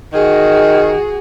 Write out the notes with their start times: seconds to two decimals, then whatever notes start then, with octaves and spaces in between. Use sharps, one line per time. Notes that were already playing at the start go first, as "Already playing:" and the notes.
0.13 D#3 F#4 G#4